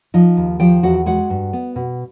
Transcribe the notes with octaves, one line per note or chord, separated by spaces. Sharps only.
F3 D#4 D#5
D#2
F3 G4 G5
E2 F#4 F#5
G#3 F#4 F#5
G2
B3
B2